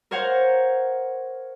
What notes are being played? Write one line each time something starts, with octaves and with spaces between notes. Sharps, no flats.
A#4 C5 C#5 F5 F#5